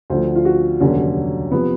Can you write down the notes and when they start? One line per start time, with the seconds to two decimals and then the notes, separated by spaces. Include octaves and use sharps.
0.10 D2 D3 F3 C5
0.35 F4
0.45 F#4
0.80 F1 D#2 D3 F#3 C#4
1.52 C3 F3 B3